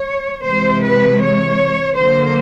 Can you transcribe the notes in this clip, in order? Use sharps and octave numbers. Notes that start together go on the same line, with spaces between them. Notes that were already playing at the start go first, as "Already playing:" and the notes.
Already playing: C#5
C3 E3 G#3 C5
B4
C#5
D3 F#3 A#3 C5